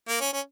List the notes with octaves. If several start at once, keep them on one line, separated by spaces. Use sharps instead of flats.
A#3
C#4
C#4